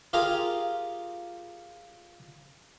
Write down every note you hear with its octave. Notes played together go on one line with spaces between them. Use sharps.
F4 G4 G#4 A#4 F5